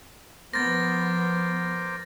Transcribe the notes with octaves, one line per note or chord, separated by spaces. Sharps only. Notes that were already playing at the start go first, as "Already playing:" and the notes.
F3 B3 A#4 C5 D6 A6 A#6